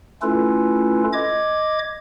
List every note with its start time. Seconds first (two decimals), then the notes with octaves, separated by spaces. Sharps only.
0.22 A3 C#4 E4 F4 A4 B4
1.13 D#5 D6 G#6